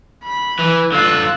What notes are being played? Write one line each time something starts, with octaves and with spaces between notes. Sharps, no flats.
B5
E3
D3 F4 E6 F#6